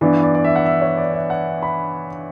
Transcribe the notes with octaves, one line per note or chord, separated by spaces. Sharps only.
G2 E3 B3 D5
D5
D5
E5
F#5
E5
C#5
D5
E5
F#5
B5